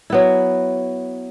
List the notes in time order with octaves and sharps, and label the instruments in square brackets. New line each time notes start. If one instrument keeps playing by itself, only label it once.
[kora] F#3 B3 E4